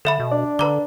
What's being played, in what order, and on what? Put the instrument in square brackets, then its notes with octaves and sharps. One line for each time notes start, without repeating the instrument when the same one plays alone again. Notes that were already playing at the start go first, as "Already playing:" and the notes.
[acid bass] D3 [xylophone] A4 E5 B5
[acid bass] B2
[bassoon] D4 [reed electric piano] D5
[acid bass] D3 [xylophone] B4 A#5 D6